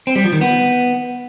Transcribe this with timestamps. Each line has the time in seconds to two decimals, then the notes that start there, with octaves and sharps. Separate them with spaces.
0.07 C4
0.16 G3
0.24 F3
0.33 D#3
0.41 B3